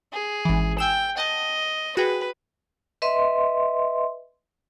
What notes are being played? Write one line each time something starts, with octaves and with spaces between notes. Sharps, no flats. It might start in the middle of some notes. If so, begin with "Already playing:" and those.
G#4
G#1 E3
G5 G#5 E6 E7
D#5 F#5 A5
F#4 G#4 B4 G5
B4 D#5 E5 C6